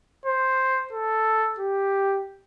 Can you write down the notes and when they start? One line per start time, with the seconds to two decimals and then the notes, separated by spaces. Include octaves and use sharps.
0.26 C5
0.93 A4
1.59 G4